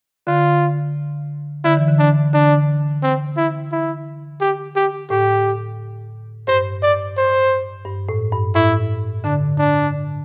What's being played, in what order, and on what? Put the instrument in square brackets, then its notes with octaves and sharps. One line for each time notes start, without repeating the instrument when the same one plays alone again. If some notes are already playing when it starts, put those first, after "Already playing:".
[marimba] D3 [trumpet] F4
[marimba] D3 [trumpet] E4
[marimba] E3
D3
[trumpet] D4
[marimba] D3 [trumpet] D4
[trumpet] C4
E4
E4
G4
G4
[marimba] A2 [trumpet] G4
[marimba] G2 [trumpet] C5
[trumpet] D5
C5
[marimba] G2
A2
G2
[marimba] A2 [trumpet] E4
[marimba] D3 [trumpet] D4
[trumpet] D4